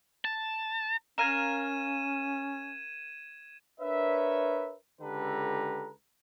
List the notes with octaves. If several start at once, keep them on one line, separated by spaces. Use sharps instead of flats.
A5
C#4 A#4 F5 G#6 D#7 E7
D4 A#4 B4 C#5 E5
C#2 D3 G4 A4 B4 A#5